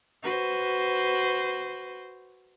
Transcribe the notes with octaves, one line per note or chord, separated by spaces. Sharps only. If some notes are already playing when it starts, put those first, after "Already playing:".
F#4 B4 C5